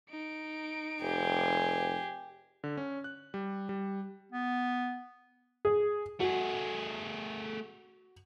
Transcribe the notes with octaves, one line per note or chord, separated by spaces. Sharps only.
D#4 D7
F1 G4 G#4
D3
C#4
F#6
G3
G3
B3
G#4
A3 F#4 G#4